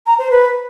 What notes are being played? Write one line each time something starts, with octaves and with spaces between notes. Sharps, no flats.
A#5
C5
B4